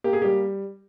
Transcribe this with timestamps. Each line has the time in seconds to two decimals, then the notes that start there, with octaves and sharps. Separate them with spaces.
0.04 A#3 G4
0.13 G#4
0.22 G3 G4